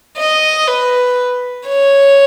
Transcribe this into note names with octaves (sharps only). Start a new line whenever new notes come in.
D#5
B4
C#5